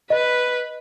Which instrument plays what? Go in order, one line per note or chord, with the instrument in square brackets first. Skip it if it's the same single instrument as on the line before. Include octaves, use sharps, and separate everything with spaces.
[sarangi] B4 [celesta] D#5